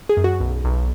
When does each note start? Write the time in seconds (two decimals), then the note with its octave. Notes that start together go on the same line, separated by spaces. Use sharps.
0.09 G#4
0.17 F#2
0.24 F#4
0.40 B1
0.64 B1